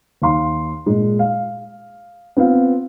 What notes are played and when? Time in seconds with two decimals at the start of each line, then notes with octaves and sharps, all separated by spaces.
0.22 D#2 F5 C6
0.86 A#2 G#3
1.19 F5
2.37 B3 C4 F4 F5